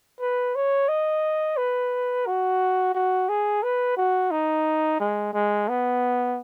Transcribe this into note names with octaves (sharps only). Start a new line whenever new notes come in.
B4
C#5
D#5
B4
F#4
F#4
G#4
B4
F#4
D#4
G#3
G#3
B3